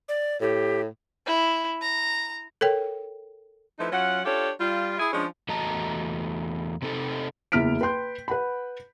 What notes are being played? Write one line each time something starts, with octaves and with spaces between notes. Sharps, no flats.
D5
A2 G4
E4
A#5
A4 A#4 C#5 G5
F3 A3 D#4 E4 B4
F#3 C#4 F4 F#5
D4 F4 G4 A4 C#5
G3 F4
E4 G#4
F3 G#3 C#4 D4
E2 A3 F#4 D#5 A5 A#5
C3 C4 D#4 A4
F#1 E2 E4 F6 B6 D7
B4 G5 C6 G6
B4 F#5 B5